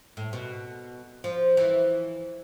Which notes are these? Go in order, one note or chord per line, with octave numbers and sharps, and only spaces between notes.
A2
B2
F3
E3